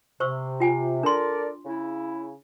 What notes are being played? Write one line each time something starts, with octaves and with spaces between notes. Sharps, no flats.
C3 C5 C#6 E6
F4 G5 G#5
D4 A4 A#4 D5 C6
C#3 E4